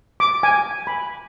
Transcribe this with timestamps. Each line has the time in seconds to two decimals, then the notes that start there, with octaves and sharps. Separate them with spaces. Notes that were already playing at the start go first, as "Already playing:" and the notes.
0.20 D6
0.43 G#5
0.87 B5